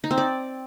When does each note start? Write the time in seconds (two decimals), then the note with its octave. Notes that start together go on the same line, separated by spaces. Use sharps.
0.04 D#4
0.11 C4
0.18 D5